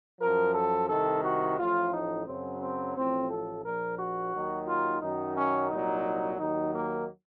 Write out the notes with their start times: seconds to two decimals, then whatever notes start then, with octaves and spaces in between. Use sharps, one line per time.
0.20 F#2 F3 A#4
0.55 A4
0.89 C2 C3 D#3 A4
1.23 F#4
1.58 A1 A2 F3 F4
1.93 D#4
2.26 F#2 C#3 F#3 C4
2.62 C4
2.96 A1 A2 F3 C4
3.30 A4
3.64 A#1 A#2 F3 A#4
3.98 F#4
4.33 D#2 D#3 F#3
4.67 F4
5.02 F#2 D#3 F#3 D#4
5.36 C#4
5.70 C2 A#2 F#3 D#4
6.39 D#2 D#3 F#3 D#4
6.74 A#3